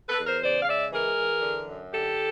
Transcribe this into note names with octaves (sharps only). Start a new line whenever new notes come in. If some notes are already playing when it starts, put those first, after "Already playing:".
A4 B4
E2
A#4 C5
C#3 C5 D5
F5
G#3 D5 E5
E3 G#4 A#4
E3
D3
F#2
D3 G4 A4